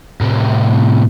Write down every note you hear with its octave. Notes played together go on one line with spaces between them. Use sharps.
A2 C3